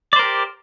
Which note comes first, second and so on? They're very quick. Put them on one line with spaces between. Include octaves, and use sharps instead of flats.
D5 C5 A#4 G4